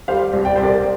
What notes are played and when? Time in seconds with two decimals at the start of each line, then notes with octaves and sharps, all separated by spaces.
0.08 G3 C5 F5
0.33 C2
0.45 D5 G5
0.56 C2 C5
0.63 A#4 D5